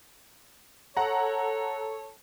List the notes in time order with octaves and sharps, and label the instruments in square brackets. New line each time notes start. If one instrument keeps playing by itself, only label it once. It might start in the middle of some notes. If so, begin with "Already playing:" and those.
[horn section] A4 C#5 [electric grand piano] F#5 A#5